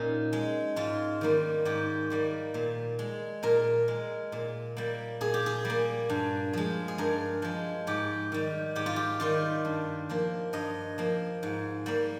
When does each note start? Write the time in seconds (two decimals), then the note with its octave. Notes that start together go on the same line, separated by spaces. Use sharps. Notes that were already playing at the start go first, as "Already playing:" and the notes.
Already playing: A#2 C#4 D#4
0.33 G#3
0.76 G#2 F4
1.21 D#3 G3 A#3
1.65 G#2 G4
2.10 D#3 G3 A#3
2.54 A#2
2.99 G#3
3.43 A#2 A#4
3.88 G#3
4.32 A#2
4.77 G3 A#3
5.21 A#2 G#4
5.34 G4
5.46 G#4
5.65 G3
5.70 A#3
6.10 G2
6.53 F3 G#3
6.88 G#4
6.98 G2 A#4
7.42 F3 G#3
7.87 G#2 G4
8.32 D#3 G3
8.76 G#2 G4
8.86 F4
8.96 G4
9.20 D#3 G3 F4
9.65 G2
10.10 F3 A#3
10.53 G2 D#5
10.98 F3 A#3
11.43 G#2
11.86 G3 A#3